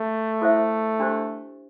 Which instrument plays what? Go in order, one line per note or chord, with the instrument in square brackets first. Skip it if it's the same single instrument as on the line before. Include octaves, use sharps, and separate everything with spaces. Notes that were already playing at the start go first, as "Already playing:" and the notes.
Already playing: [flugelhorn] A3
[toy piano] E4 A4 C5 E5
D4 G4 C5